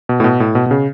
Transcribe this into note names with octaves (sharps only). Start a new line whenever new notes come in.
B2
A2
B2
A2
B2
B2
C#3